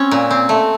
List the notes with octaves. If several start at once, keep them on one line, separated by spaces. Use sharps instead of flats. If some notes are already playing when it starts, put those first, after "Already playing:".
Already playing: C4 C#4
A#2
C4
A3